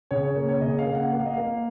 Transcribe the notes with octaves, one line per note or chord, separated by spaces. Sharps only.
C#3 C#5
C#5
A#3
C#5
C#3 D#5
F5
A#3
F#5
A#3 F#5
F5
D#5
A#3 F5